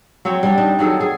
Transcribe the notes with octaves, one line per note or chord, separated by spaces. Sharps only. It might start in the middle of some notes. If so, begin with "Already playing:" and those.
F#3 C4 C#5
G3 D4
D4 D#4
D#3 F#3 G#4 A4
G#4